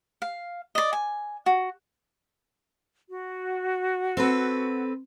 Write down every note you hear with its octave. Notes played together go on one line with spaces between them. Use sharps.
F5
D5 D#5
G#5
F#4
F#4
C4 A4 B4